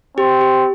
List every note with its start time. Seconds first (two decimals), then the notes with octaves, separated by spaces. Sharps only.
0.18 C4 G4
0.41 G4